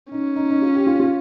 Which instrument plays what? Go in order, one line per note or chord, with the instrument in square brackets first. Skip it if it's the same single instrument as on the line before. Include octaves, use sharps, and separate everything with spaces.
[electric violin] C#4 [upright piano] D#4
[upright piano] D#4
D#4
F4
G4
F4
F4